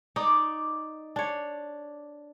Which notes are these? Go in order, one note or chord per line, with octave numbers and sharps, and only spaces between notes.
D#4 D5
D4 C#5